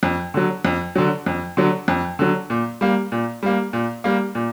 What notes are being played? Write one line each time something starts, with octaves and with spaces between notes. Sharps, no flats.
F2
D3 F#3
F2
D3 F#3
F2
D3 F#3
F2
D3 F#3
A#2
G3 A#3
A#2
G3 A#3
A#2
G3 A#3
A#2